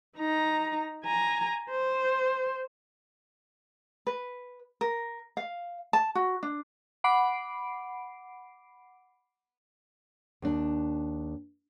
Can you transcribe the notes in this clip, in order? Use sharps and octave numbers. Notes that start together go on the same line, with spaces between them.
D#4 A#5
G#5 A#5
C5
B4
A#4
F5
A5
F#4
D4
F#5 B5 D6 C7 D7
D#2 D4